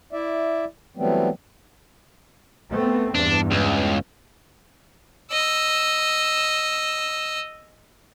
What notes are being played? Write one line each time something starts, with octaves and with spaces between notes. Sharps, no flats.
E4 D5 E5
E3 F#3 G3 A3 B3 C4
A3 B3 C4
E2 G2 D4
C#2
D#5 E6